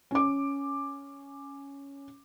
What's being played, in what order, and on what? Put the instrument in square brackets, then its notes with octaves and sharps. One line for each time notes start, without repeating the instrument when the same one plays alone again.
[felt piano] C#4 D6